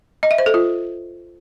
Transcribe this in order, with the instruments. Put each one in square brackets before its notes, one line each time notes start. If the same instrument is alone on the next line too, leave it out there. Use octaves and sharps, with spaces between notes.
[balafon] D#5
E5
C5
A4
F4